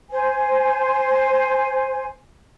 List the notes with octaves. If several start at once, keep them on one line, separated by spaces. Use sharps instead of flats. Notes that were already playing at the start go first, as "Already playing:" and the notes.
C5 G#5